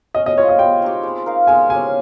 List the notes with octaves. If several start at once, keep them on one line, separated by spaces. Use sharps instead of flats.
C#4 D#5
D#5
F4 C5 C#5
D#5
G3 G5
C4 D#4 G4
G#3
D#4 A#4 F5
G#3 G#5
C#4 G4 G#5